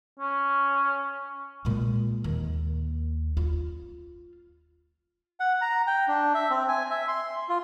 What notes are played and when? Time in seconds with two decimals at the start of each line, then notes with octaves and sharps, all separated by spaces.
0.19 C#4
1.65 A#2 G#3
2.24 D#2
3.37 F4
5.40 F#5
5.61 A#5
5.87 G5
6.08 D4
6.35 E5
6.50 C4
6.68 G#5
6.90 E5
7.08 C6
7.49 F4